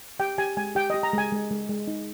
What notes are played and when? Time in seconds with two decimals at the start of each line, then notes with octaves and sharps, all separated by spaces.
0.19 G4 G5
0.38 G4 G#5
0.57 G#3 G#5
0.75 G4 G5
0.90 G4 D#5
1.03 A#5
1.13 G#3 G#5
1.32 G#3
1.51 G#3
1.69 G#3
1.88 D#4